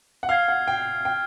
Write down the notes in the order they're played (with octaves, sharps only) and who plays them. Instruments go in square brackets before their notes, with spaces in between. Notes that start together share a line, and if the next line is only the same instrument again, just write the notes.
[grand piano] F#5
[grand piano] F5 [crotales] F6 G#6 C7
[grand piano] F#5
G5
G5